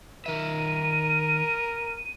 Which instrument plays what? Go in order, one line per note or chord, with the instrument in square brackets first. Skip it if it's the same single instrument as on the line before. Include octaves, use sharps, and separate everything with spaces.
[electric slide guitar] D#3 E5 [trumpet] A#4 [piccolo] D#7